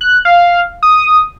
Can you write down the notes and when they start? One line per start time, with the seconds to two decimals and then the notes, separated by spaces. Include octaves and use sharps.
0.01 F#6
0.25 F5
0.83 D#6